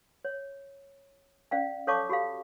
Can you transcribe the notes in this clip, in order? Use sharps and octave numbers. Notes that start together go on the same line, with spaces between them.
C#5
C#4 D5 F5 G5
A4 C#5 F5 A5 C#6 D6
F#4 G4 A4 F5